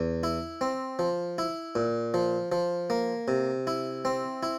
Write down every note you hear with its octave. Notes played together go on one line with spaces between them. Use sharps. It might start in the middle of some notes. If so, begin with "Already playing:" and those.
Already playing: E2
E4
C4
F3
E4
A#2
F3
F3
A#3
C3
E4
C4
E4